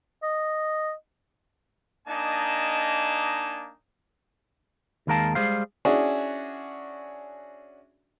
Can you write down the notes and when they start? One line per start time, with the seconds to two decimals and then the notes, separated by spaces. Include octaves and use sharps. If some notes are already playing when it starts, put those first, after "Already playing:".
0.23 D#5
2.08 A#3 D4 D#4 D#5 G#5 A5
5.07 D#2 D#3 G#3 A#4 F5 A5
5.35 G3 G#3 G#4 C5 F5
5.85 C#4 D4 E4 F#4 G#4